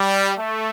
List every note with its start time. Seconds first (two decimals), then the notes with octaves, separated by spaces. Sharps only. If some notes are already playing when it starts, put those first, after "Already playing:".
Already playing: G3
0.39 A3